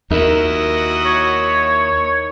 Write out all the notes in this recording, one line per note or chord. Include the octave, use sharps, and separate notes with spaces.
D#2 D#4 E4 F#4 A#4 D#5
C#5